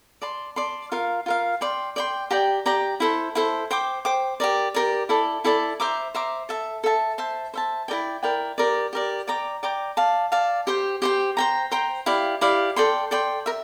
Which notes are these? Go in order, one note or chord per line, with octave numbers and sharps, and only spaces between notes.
D5 A5 C6
D5 A5 C6
F4 A#4 F5
F4 A#4 F5
D5 G5 C6
D5 G5 C6
G4 D5 G5 A#5
G4 D5 G5 A#5
E4 A4 C5
E4 A4 C5
C5 G5 D6
C5 G5 D6
G4 A#4 D5
G4 A#4 D5
E4 A4 D5 A5
E4 A4 D5 A5
C5 E5 A#5 D6
C5 E5 A#5 D6
A4 E5 A5
A4 E5 A5
C5 E5 A5
C5 E5 A5
E4 A#4 D5 G5
E4 A#4 D5 G5
G4 A#4 D5
G4 A#4 D5
D5 G5 A#5 D6
D5 G5 A#5 D6
D5 F5 A5
D5 F5 A5
G4 C5 G5
G4 C5 G5
C5 G5 A#5
C5 G5 A#5
E4 G4 D5 F5
E4 G4 D5 F5
A4 D5 G5 C6
A4 D5 G5 C6
A#4 E5